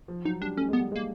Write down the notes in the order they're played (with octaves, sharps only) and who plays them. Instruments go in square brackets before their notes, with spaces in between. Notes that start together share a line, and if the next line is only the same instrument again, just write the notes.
[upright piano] F3
[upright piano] F#3 [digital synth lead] D#4
[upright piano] G3 [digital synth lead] D4
[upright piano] A3 [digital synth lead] C#4
[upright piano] G#3 [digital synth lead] B3
[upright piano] G3
[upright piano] G#3 [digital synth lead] A#3